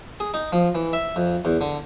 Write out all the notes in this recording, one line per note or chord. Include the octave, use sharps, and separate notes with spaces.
G#4
D#4
F3
E3
E5
F2
E2
D3